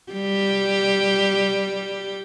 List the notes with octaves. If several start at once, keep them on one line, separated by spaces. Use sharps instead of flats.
G3 G4